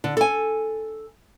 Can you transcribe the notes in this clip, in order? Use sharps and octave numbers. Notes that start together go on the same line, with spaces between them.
D3
A4 G#5